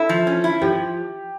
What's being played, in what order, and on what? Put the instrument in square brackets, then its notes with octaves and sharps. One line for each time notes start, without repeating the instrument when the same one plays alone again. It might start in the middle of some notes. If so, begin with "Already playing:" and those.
Already playing: [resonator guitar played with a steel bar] E4 [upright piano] A4
[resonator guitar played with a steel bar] F3
C#4
E4
[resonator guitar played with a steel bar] F3 [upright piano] G4